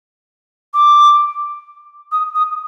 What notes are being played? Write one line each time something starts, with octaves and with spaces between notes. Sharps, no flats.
D6
D#6
D#6